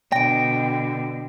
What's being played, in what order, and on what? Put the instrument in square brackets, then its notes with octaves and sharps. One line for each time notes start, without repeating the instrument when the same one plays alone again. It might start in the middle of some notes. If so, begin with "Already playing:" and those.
[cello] B2 D3 [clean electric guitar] G5 [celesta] A#6 D7